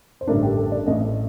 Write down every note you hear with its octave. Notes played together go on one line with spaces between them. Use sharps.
C5
A1 G2 D3 A3 D4 A#4
G4
A4
D5
A1 A2 A3 D#5